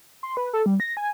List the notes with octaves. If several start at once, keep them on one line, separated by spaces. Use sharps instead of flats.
C6
B4
A4
G3
A#6
G#5